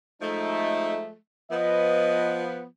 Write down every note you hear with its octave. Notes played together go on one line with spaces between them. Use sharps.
F3 G#3 A3 D#4
F3 B3 D#5